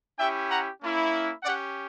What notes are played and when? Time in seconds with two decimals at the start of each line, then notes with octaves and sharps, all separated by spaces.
0.18 C#4 E4 G4 E5 G5
0.50 F#5 A#5
0.81 A#3 C#4 E4
1.43 C#4 G4 D5 F#5